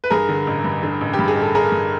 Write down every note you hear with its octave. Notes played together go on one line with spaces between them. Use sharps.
B4
G2 G#4 A#4
D3
A1
G2
D3
A1
G4
G2
G#4
A1 A4
A1 G#4 A#4
G2